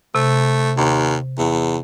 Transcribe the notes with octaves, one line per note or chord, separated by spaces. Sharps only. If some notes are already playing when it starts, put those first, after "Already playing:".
C3 A3
D#2
E2